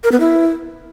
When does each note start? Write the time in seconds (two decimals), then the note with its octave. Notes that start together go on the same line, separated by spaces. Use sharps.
0.04 A#4
0.12 B3
0.20 E4